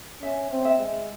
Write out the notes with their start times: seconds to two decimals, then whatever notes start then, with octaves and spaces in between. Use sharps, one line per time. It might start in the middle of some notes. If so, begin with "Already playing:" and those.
0.22 C#4 E5
0.51 C4
0.65 E5
0.79 G#3